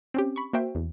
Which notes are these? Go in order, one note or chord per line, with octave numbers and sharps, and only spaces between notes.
C4 C#4 G4
B5 C#6
A#3 F#4 C5 E5 G5
E2